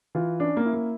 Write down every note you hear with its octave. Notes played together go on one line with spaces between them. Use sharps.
E3 F4
C#4 D4
A#3
E4
A#3